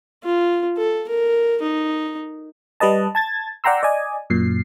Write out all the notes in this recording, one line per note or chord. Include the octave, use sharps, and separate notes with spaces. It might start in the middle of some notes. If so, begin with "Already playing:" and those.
F4
A4
A#4
D#4
G3 B4 D#5 A5
A5 G#6 A6
D5 F#5 G5 A#5 C6 E6
D5 D#5 G#5
F#2 A#2 C7